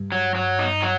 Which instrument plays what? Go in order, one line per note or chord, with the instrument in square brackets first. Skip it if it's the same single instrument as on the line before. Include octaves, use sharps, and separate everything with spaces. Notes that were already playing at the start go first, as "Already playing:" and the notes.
Already playing: [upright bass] G2
[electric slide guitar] F#3
F#3
D#4
F#3